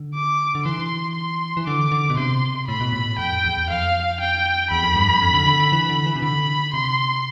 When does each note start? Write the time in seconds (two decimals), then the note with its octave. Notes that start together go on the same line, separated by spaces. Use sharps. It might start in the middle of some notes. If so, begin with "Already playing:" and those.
Already playing: D3
0.14 D6
0.55 D3
0.65 E3 C6
1.16 C6
1.57 E3
1.66 D3 D6
1.92 D3
2.10 B2
2.17 C3 C6
2.68 A2 B5
2.80 B2
2.93 A2
3.18 F2 G5
3.44 E2
3.70 F2 F5
4.20 G5
4.71 E2 B5
4.83 F2
4.96 G2
5.09 F2
5.22 F2
5.34 D3
5.46 D3
5.60 D3
5.72 E3
5.89 D3
6.06 E3
6.16 C3
6.22 D3 B5
6.73 C3 C6